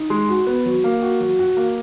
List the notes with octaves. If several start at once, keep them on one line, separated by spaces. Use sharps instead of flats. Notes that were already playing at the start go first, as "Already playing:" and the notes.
Already playing: D#4
G#3
F#4
B3
F#3
A#3
F#4
F#3
F#4
A#3